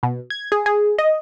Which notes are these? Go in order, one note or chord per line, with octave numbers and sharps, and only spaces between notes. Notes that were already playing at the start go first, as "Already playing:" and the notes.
B2
G#6
G#4
G#4
D#5